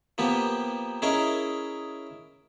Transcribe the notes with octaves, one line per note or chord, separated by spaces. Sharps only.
F3 A#3 B3 G4
C#4 E4 G#4 A#4 D#5